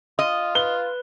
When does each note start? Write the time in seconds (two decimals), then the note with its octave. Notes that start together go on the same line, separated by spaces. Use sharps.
0.19 F4 D#5
0.55 B4 G7